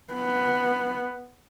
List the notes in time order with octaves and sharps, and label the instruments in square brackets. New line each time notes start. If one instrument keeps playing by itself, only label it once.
[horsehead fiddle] B3